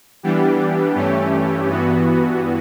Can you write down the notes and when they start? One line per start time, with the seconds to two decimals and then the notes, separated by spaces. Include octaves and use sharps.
0.23 E3 G3 B3 D4 G4
0.95 G2 E3 A3 C#4 G4
1.67 G2 E3 B3 F#4